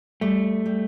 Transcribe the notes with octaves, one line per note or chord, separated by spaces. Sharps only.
G3 A3
G3